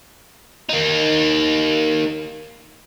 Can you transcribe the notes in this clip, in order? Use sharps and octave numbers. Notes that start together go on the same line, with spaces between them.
A#3 D#4